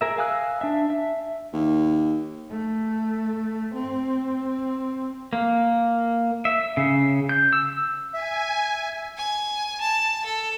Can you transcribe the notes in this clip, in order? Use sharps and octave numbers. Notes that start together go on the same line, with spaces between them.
G#4 A#4 E5
F5 G#5 D#6 E6 F#6
D4 E5
E5
D#2
A3
C4
A#3
E5
C#3
G6
E6
E5 G#5
G#5
A5
A4